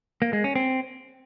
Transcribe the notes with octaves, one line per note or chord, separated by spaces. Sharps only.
A#3
G#3
C#4
C4